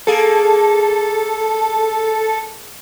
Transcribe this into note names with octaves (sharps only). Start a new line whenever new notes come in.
A#3 G#4 A4